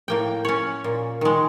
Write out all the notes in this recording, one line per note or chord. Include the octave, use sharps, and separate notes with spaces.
A2 A#3 G5
C#4 C#5
A#2
D#3 G#3